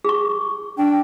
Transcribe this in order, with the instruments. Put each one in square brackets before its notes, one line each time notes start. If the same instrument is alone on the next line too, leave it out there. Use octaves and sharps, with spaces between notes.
[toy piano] G#4 C#6
[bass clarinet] D4 [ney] G5